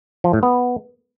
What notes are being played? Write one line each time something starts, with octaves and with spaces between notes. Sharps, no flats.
F3
A2
B3